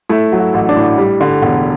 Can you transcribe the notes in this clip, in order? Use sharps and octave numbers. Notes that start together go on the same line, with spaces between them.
A3 E4
F#3
F#4
A1
D4
A2
G3
D3
E1